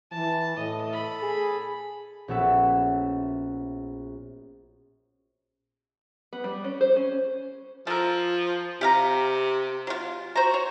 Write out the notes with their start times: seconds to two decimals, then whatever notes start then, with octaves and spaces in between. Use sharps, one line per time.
0.12 E3 A5
0.57 A2 D#5
0.89 A4 B5
1.22 G#4
2.28 A#1 B3 C#4 F#4 A4 E5
6.33 B3
6.44 G3
6.64 C#4
6.81 C5
6.96 C#4
7.87 F3 A4 A#4
8.81 C3 G4 F5 A#5
9.87 F#3 F4
10.35 F#4 C5 A#5
10.54 C#5